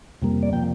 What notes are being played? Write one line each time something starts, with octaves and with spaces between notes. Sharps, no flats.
F2 C3 G3 A#3
D5
C3 F3 A#3 G5